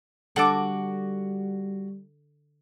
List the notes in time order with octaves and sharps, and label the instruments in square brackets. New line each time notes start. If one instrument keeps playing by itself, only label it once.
[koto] D3 A4 [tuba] G3 [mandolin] F#4 D6